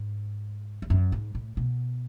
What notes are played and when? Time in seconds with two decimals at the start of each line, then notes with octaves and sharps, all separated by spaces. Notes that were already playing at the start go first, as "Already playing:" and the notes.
Already playing: G#2
0.82 E2
0.90 F#2
1.12 G#2
1.35 A2
1.57 B2